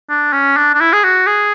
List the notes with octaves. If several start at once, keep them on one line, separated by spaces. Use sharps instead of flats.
D4
C#4
D4
D4
E4
G#4
F#4
G#4